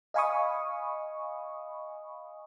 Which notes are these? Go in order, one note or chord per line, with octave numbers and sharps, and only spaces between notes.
D#5 F5 G#5 B5 C#6 D#6